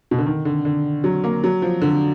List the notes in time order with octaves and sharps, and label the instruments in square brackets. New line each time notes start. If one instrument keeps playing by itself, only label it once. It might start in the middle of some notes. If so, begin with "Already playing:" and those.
[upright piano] B2
D3
D#3
D3
D3
F#3
A#3
F#3
F3
D3